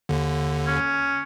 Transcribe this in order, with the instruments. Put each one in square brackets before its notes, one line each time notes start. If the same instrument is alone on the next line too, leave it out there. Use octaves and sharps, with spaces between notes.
[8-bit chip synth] D#2 D3
[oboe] C#4